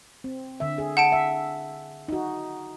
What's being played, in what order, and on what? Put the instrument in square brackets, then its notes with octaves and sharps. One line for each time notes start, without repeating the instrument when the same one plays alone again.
[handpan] C4
D3 E5
G#4
[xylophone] F#5 A5 D7
[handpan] E5
D#4 F#4